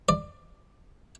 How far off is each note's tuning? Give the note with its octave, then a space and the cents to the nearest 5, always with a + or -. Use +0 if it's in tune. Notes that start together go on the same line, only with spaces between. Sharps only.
D5 +20